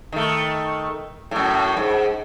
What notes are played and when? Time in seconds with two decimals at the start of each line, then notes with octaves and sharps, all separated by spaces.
0.12 D#3 A3
1.31 F#2 A2
1.77 G#2